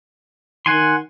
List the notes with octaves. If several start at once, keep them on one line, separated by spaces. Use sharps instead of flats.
D#3 F#5 G#5 C6